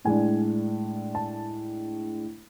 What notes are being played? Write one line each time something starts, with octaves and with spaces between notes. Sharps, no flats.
A2 G#3 D4 G#5
A5